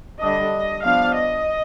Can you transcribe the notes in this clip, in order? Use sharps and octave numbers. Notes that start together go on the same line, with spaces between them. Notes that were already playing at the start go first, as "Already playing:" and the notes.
D3 G3 D4 D#5
F3 B3 D4 F5
D#5